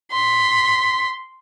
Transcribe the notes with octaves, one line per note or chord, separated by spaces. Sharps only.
C6 B6